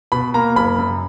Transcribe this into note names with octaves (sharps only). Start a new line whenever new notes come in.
B2 B5
A#3 A#5
F#1 B5
F#2